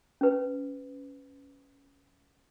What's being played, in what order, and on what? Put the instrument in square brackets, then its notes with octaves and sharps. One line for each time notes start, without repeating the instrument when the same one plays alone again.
[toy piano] C#4 B4